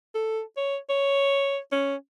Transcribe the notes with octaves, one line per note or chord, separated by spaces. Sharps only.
A4
C#5
C#5
C#4